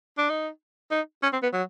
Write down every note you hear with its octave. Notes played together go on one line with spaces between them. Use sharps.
D4
D#4
D#4
C#4
C4
B3
F#3